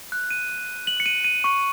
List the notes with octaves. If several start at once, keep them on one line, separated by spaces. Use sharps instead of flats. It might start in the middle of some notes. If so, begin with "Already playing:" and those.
F#6
D#7
F#7
C#7
D#7
D#7
C#6